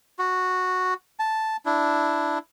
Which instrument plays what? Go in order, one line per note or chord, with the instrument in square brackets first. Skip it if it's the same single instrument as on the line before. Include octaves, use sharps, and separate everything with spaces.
[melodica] F#4
A5
D4 E4